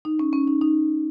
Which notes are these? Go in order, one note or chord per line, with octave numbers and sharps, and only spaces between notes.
D#4
C#4
C#4
D#4
D#4